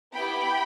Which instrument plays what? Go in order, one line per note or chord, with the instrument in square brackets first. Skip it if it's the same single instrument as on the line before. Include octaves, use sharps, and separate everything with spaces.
[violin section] B3 E4 G4 G5 B5